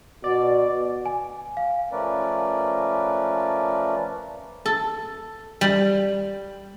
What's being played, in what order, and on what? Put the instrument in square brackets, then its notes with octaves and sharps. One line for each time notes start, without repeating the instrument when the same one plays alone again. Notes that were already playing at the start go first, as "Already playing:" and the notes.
[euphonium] B2 [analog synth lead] D5
[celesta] G#5
F5
[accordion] F3 A3 C#4 A#4 B4 D5
[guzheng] A4
G3